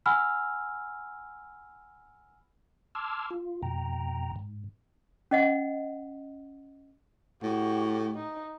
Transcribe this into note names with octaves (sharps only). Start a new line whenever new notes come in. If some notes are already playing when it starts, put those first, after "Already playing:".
F#5 G#5 B5 E6 F6
A5 C6 D6 E6 F6 G#6
F4
F2 B2 G5 A#5
G#2
C#4 D#5 F#5
A2 F#4 G4
D#4